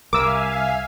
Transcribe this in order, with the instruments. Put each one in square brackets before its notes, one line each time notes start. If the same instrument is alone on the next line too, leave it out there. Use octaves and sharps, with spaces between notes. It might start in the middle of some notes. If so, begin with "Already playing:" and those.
[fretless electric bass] C2 [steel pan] A#4 E6 [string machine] E5 F5 G#5 [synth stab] D6